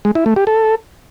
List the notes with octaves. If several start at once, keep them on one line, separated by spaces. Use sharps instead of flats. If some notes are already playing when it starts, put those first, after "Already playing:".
G#3
E4
A3
G4
A4